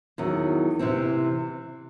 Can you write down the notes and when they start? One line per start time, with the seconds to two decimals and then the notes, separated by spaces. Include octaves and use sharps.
0.18 E2 D#3 F#3
0.79 C3 E3 C4